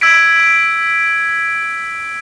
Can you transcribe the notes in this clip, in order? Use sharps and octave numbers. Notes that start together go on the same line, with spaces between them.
E6 G#6 B6 D7